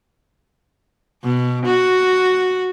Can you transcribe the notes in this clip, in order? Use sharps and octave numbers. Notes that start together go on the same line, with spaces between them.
B2
F#4